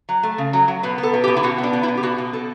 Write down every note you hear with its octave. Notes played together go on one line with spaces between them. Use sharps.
F#3
A3
C#3
F#3
F#3
B2 B4
B3
A4
B2
G4
B2
E4
B2 F#4
B3
D4
B2
E4
B2
G4
B2 F#4
B2
B2 A4